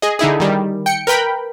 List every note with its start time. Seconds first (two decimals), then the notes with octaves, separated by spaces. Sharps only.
0.02 G#4 D#5
0.19 D3 D#4 E4 G#4
0.40 D#3 G3
0.86 G5 C#7
1.07 A#4 B4 G5 B5